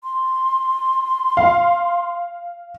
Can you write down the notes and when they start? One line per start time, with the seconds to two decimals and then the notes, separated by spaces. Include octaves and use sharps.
0.04 C6
1.37 F5